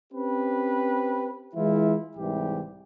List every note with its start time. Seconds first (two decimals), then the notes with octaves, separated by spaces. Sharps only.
0.13 C4 C#4 G4 B4
1.55 E3 G#3 E4 F4
2.17 C2 G#2 E3 G4